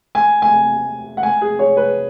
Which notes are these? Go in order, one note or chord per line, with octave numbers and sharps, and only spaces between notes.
G#5
G#5
F#5
G#5
G#4
C#5
B4